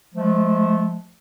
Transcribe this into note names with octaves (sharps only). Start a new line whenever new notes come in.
F3 G#3 A3